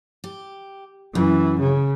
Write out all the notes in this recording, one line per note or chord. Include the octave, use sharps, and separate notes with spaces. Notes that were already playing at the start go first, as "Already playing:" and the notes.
G4
F#2 E3
C#3